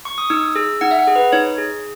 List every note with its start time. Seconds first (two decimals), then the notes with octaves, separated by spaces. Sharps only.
0.05 C#6
0.18 D#6
0.30 D#4 E6
0.55 G#4 E6
0.81 D#4 F#5
0.91 E5
0.99 F#5
1.07 G#4
1.16 B4
1.32 D#4 C#5
1.58 G#4